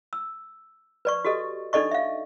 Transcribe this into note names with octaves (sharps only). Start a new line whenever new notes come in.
E6
B4 D5 C#6
F#4 G4 A4 D#5
D4 D#4 A4 D5 D#5 C#6
E5 F5